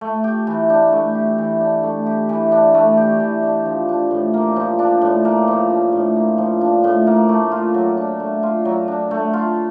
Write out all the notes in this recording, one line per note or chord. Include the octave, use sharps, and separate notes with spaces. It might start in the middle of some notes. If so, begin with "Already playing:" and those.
A3
G4
E3
D4
A3
G4
E3
D4
A3
G4
E3
D4
A3
G4
E3
D4
F3
D4
A2
A#3
F3
D4
A2
A#3
F3
D4
A2
A#3
F3
D4
A2
A#3
A3
F4
F#3
D4
A3
F4
F#3
D4
A3
F4